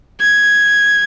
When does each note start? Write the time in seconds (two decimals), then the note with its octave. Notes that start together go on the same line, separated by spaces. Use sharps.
0.21 G#6